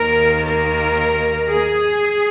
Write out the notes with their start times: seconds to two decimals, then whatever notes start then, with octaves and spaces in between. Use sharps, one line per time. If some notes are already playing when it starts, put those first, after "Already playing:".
Already playing: D#2 D#3 A#3 A#4
0.44 A#4
1.49 G#4